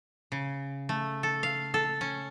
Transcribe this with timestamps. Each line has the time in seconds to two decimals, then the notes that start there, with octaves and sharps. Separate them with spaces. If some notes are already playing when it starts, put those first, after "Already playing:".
0.32 C#3
0.89 A3
1.23 A4
1.43 F5
1.74 A4
2.01 C#4